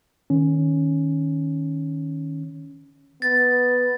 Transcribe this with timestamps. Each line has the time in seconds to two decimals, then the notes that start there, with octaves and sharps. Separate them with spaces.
0.30 D#3 C#4
3.22 B3 A6